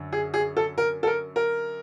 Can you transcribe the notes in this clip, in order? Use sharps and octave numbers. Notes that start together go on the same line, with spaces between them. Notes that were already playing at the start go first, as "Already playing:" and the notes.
Already playing: F#2 D3
G#4
G#4
A4
A#4
A4
A#4
A#4